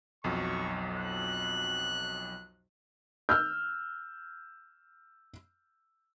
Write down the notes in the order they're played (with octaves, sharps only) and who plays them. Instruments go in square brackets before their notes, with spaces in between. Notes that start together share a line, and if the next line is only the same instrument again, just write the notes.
[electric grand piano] B1 F2 F#3 [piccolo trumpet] C#6
[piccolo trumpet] F#6
[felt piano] E6 F6 G6